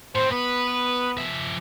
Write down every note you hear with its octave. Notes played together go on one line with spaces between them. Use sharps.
A2 C4 C5
B3 B4
F3 E5